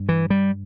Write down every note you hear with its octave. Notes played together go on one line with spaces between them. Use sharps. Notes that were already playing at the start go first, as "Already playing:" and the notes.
Already playing: G2
E3
G3